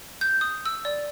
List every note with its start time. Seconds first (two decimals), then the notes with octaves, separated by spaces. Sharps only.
0.21 G6
0.41 D#6
0.66 E6
0.85 D5